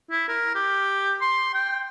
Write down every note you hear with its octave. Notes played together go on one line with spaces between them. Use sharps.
E4
A#4
G4
C6
G5